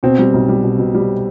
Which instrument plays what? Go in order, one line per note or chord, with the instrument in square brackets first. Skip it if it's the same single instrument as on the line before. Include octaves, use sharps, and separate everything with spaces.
[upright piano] B2 [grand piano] C4
[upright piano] G3
B1
G3
B2
B2
G3